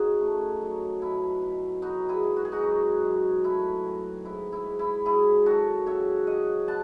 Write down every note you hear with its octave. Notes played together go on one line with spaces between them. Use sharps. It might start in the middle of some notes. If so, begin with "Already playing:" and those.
Already playing: C#3 D#4 F#4 G#4
A3
F#3
B2 E4
B2
B3 D#4 F#4
E4 G#4
G#3
F#4
G#4
D#4 F#4
F#2
F#2
A3 E4
D#3
G#2 E4
E4
G#2
E4
F#3 E4 G#4
D#3 F#4 A4
C#3 C#5 E5
C#3 D#5 F#5
B3 F#5 A5